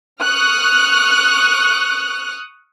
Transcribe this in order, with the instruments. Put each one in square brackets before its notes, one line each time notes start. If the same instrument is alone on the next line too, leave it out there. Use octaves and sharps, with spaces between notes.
[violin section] C#6 D#6 F6 F#6